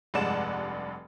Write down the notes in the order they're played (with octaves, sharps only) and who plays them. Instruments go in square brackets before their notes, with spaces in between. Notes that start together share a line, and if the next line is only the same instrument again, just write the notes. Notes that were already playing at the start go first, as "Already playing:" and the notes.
[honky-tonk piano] F1 G2 G#3 D5 F#5 E7